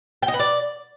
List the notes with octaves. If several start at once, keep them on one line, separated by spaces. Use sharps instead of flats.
G5
D#5
B4
D5